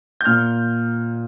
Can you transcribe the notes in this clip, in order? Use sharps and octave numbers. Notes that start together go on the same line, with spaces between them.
G6
A#2 F6